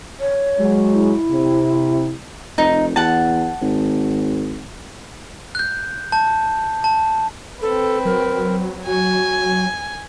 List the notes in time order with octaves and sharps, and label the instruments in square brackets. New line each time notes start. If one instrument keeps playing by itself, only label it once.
[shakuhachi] C#5
[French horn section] F#3 G#3
[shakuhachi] E4
[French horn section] C3
[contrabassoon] F1 [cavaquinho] D#4
[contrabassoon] E2 [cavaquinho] F#5 A5
[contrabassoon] G#1
[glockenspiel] F#6 G6
A5 G6
A5
[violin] C4 B4 [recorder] A4
[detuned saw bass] F#3 [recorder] A#4
[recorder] F#4 [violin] G#5